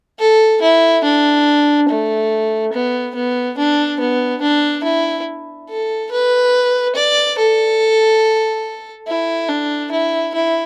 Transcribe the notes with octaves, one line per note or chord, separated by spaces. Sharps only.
A4
E4
D4
A3
B3
B3
D4
B3
D4
E4
A4
B4
D5
A4
E4
D4
E4
E4